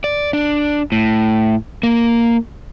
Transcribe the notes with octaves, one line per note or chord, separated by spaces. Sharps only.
D5
D4
A2
A#3